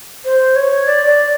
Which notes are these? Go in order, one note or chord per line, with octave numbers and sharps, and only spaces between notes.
C5
C#5
D5
D5